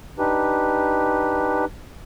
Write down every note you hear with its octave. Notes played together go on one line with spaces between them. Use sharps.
D4 D#4 G4 B4